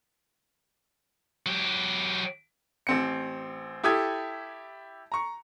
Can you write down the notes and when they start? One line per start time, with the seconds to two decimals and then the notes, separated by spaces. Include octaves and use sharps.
1.46 F#3 G4
2.87 A1 C4 C#7
3.84 E4 G4 A4 D#6 G#6
5.12 A#5 C#6